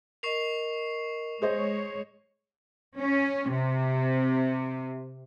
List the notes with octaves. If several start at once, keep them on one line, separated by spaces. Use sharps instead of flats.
A#4 D#5 C#6 C7 F7
G#3 G#4 C5 C#5 D#5
C#4
C3